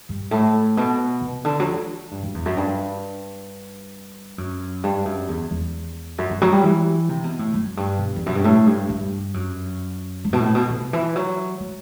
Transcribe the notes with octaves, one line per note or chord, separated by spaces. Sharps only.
G2
A2
B2
C3
D3
F#3
E3
G2
F#2
E2
F#2
G2
F#2
G2
F#2
E2
E2
F#2
G2
F#3
G3
E3
C3
B2
A2
F#2
G2
B2
E2
F#2
G2
A2
G2
G2
F#2
G2
B2
A2
B2
C3
E3
F#3
F#3